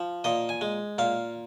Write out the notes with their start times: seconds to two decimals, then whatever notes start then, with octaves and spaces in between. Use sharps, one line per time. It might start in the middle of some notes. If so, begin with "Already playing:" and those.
Already playing: F3
0.24 A#2 D#5
0.49 G#5
0.61 G#3
0.98 A#2 F5